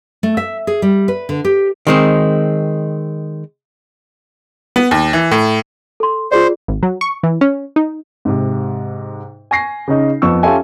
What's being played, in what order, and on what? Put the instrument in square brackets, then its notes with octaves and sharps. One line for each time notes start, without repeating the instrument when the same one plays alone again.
[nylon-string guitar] A3
E5
G#4
G3
B4
D3
G4
[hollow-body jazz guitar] D#3 G#3 C4
[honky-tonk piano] B3
D#2
E3
A2
[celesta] A4 C6
[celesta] F4 G#4 D5 [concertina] C5
[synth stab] G#1
F#3
C#6
E3
C#4
D#4
[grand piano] G#2 C3
G#5 C#6 A#6 C7
C#3 C#4 D#4
F2 F3 B3 C#6 E6
C#4 F4 G4 A4 E5 G#5